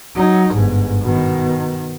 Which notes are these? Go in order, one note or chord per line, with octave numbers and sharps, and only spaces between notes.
F#3 D#4
G1 G#2
B2 D#3